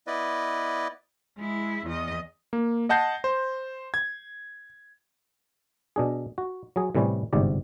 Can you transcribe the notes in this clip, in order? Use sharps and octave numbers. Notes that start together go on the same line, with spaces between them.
B3 E4 B4 D5 D#5
G#3 E4
E2 D#5
A#3
D#5 F#5 A5 G6 A#6 C7
C5
G#6
B2 D4 G#4
F#4
F#3 G#4
A2 C3 E3 G3 C#4
G1 G#2 C3 D5